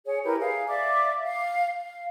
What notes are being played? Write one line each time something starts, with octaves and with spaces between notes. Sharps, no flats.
G#4 C#5
E4 G4 A#4 B4
G#4 F5
D5 E5 F5 D6
F5
F5